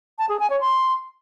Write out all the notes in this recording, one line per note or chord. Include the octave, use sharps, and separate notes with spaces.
A5
G#4
G#5
C#5
C6